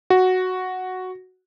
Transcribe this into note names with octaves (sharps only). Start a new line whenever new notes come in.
F#4